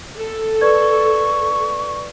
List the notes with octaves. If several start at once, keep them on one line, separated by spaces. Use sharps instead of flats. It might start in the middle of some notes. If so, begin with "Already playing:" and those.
A4
B4 D5 C#6 G#6